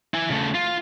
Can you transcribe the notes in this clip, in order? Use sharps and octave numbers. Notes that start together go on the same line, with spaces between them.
E4 G#5
C#3 A3
F4